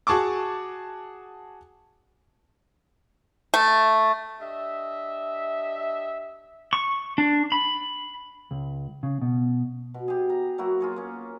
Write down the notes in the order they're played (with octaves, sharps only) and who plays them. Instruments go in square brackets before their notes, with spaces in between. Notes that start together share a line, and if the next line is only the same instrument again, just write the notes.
[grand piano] F#4 G#4 A5 C#6 D6
[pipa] A3
[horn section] D4 G4 D#5 E5
[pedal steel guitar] C#6
D4
B5
[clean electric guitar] C#2
C#3
B2
[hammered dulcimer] B2
G4 G#4
A#5
F#3 A#3 E4 F#4
F4 G#4 C#5
A#3 C#4